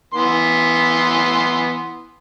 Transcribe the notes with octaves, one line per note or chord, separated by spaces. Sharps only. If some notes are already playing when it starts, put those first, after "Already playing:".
E3 B3 C6